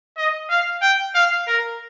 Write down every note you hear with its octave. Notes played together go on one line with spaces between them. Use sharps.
D#5
F5
G5
F5
A#4